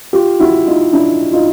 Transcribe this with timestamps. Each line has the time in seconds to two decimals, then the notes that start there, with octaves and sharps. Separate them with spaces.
0.13 F4 G4
0.40 E4 F#4
0.67 D#4 F4
0.93 D4 E4
1.33 D#4 F4